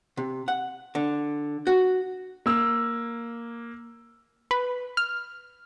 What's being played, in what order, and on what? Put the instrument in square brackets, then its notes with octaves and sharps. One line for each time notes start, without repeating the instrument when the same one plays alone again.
[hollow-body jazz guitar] C3
F#5
D3
F#4
[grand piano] A#3 E6
[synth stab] B4
F6